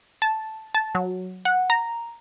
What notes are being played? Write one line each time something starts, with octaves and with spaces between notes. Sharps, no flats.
A5
A5
F#3
F#5
A#5